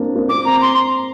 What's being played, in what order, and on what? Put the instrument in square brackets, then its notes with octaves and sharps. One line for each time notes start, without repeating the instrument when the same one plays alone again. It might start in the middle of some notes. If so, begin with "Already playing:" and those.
Already playing: [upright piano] A#3 C4 D4
A#3
[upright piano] C4 [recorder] D6
[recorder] A#5
C6